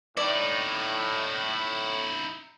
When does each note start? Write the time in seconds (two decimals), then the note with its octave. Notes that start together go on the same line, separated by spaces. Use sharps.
0.17 A2 D#4 E4 D5